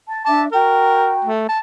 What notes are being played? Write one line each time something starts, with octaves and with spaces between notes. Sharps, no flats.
A5
D4 E5 A5 D6
F#4 A#4 G5 A#5
A3
A5